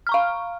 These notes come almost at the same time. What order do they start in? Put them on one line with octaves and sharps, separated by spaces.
F6 A#5 C#6 F5